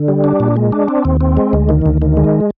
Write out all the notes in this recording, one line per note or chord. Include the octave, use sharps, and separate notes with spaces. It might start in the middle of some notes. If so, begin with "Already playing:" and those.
Already playing: D3
G3
D4
A#2
G#3
D4
C4
D#2
C4
G#3
D2
D#3
D2
D#3
G#3